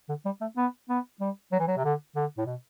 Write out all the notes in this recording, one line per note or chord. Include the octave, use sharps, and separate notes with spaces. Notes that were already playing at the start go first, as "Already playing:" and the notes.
D3
G3
A3
B3
B3
G3
F#3
E3
F#3
C3
D3
D3
A2
B2